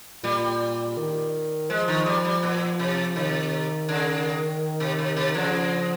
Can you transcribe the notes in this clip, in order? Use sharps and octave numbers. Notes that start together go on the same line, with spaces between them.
A#2 G3
D#3
F3 G#3
D#3
G3
G3
A#2
C3
C3 D#3
C#3
C3
C3
C3
C#3 F3